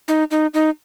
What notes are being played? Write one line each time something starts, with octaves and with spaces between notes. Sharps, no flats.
D#4
D#4
D#4